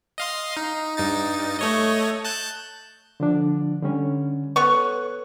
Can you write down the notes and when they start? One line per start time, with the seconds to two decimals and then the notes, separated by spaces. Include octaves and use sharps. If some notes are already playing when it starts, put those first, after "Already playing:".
0.18 D#5 F5 C6
0.57 D#4
0.97 G2 D#4 A6
1.59 A3 C#5 D#5
2.25 A5 F#6 G6
3.20 D3 F3 D4
3.82 D3 G3 C#4
4.56 B3 A4 C#5 C#6 F#6